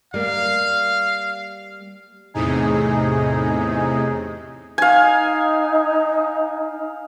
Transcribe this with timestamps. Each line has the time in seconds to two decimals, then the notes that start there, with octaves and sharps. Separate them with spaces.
0.14 G3 A#3 F5
2.34 E2 A2 C3 D#4 G#4
4.78 D#4 F5 G#5